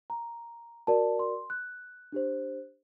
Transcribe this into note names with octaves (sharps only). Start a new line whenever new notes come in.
A#5
F#4 A#4 D5 A5
C6
F#6
D4 G4 C5